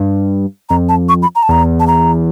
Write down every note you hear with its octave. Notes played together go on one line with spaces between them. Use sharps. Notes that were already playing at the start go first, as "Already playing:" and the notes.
Already playing: G2
F2 A#5
A5
C#6
B5
A#5
A5
E2 A#5
A5
A#5